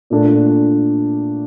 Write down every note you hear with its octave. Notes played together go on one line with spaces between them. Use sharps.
A#2 A3 D4 A4